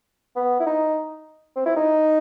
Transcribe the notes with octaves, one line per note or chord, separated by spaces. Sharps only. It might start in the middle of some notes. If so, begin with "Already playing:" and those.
B3
E4
D#4
C4
E4
D#4